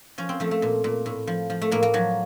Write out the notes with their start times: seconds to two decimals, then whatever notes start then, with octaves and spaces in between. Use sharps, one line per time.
0.18 F3 C#4
0.29 C4
0.40 F3 A3
0.51 A3
0.62 A#2
0.84 A#2
1.06 A2
1.27 F3
1.50 F3
1.62 A3
1.71 A2 A#3
1.83 A#3
1.94 F3 F#3